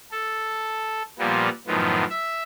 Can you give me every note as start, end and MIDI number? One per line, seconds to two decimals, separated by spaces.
0.12 1.03 69
1.19 1.49 46
1.19 1.49 53
1.19 1.49 55
1.19 1.49 58
1.19 1.49 59
1.67 2.04 42
1.67 2.04 45
1.67 2.04 51
1.67 2.04 53
1.67 2.04 59
2.10 2.43 76